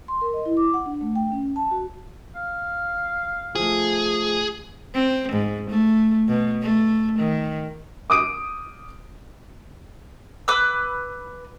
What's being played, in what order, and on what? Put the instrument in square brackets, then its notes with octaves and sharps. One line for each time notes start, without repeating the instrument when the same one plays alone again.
[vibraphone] C6
A#4
D#5
E4
D6
F#5
D4
A3
G5
C#4
A5
F#4
[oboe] F5
[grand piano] F3 A3 [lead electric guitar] G#4
[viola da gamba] C4
G#2
A3
B2
A3
D#3
[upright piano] D6 D#6 D7
[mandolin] B4 D6 E6